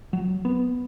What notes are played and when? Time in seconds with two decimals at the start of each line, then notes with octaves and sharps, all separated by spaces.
0.13 F#3
0.45 B3